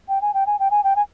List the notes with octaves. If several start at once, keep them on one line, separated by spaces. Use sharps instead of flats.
G5
G#5
G5
G#5
G5
G#5
G5
G#5